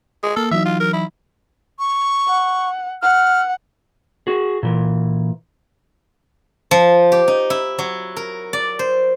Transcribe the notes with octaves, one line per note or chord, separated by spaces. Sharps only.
G#3
A#3 A4 F6
E3 F#3 D#4 E5
F4
A#4
E4
C#6
F#5
F#5 F6
F#4 G#4
A#2 E3
F3
G4
D#4
E4
F#3
A#4
D5
C5